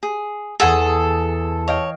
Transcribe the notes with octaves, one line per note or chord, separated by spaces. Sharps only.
G#4
E2 G#4 A4 F#5 D#6 G#6 A6
C#5 D#5 F5 G5